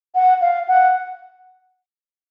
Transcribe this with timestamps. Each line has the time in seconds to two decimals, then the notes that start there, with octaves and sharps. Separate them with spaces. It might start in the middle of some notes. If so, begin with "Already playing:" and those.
0.15 F#5
0.41 F5
0.68 F#5